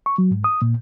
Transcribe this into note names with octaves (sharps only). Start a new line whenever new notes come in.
C#6
F#3
G#2
D#6
A#2